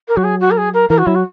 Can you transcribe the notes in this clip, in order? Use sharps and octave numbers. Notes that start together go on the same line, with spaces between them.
A#4
F#3 F#4
G#4
F#4
A#4
G#4
A#4
E3 A#4
F#4
F#3 E4
F#4